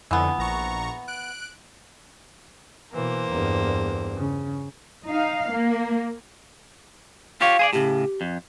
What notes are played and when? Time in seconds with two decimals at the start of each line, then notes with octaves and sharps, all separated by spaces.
0.11 F2 D3 E3 B3
0.38 A#1 A#5 C#6
1.08 F#6 D7
2.93 B2 E3 A#3 C5
3.28 E2 G2
4.15 C#3
5.08 D#4 F5
5.49 A#3
7.41 F4 G4 C#5 F5
7.59 G#4 C5 D5
7.73 A2 C#3 G4
8.21 F2